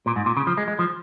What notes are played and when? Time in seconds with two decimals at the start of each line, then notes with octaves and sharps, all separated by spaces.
0.06 A#2
0.16 G#2
0.26 A#2
0.37 C#3
0.47 F3
0.57 G#3
0.68 G#3
0.79 F3